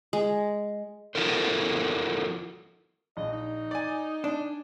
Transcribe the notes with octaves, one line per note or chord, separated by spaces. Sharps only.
G#3
F3 E4 F#4 A4 A#4 C5
A#1 D#5
D#4
D5 G#5
D4